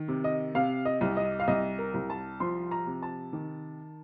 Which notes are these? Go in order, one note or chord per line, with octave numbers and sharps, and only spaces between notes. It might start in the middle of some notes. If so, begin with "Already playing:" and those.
Already playing: D#3
C3
D#5
C3 F5
D#5
C2
D#5
F5
C2 D#5
A#4
C2
A5
F3 C6
A#5
C3
A5
D#3